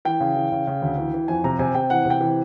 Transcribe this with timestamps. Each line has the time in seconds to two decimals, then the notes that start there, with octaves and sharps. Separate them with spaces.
0.05 E3 G5
0.20 C#3
0.36 E3
0.52 C#3
0.67 C#3
0.82 D2
0.98 E3
1.14 E3
1.28 F2 G#5
1.44 C3 A#5
1.59 C3 G#5
1.75 C3 G5
1.90 E3 F#5
2.05 C3
2.10 G5
2.21 E3